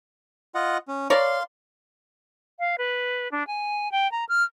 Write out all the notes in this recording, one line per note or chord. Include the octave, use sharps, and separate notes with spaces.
F4 D#5 F#5
C#4
A#4 C#5 D5 F5 C6
F5
B4
D4
G#5
G5
A#5
F6